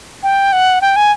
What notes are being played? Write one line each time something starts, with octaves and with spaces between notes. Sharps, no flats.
G5
F#5
G5
G#5